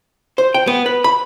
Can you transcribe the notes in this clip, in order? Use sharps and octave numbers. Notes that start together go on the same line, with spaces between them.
C5
G5
B3
B4
B5